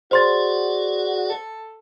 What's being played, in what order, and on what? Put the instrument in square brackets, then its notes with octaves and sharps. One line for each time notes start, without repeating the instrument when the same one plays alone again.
[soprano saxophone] F#4 [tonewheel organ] G#4 D5 [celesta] C5 C6 A6
[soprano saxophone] A4